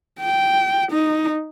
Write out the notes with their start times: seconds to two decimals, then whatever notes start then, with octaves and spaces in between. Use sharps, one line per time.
0.21 G5
0.91 D#4